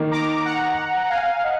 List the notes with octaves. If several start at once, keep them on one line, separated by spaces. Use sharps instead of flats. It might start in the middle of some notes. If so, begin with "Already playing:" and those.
Already playing: D#3 A#3 D#4
A#5 D6
F#5 A#5
F5 G#5
D#5 F#5